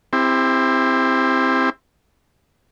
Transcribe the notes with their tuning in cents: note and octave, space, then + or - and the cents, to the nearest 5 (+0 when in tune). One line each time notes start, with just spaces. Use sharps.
C4 +0 E4 +0 G4 +35